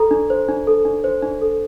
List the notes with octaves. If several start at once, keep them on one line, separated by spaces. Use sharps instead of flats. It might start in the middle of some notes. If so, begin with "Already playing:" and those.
Already playing: A4 A#5
D4
C5
D4
A4
D4
C5
D4
A4